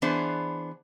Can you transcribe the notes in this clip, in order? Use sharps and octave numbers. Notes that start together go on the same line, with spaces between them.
E3 B3 D4 G#4 C5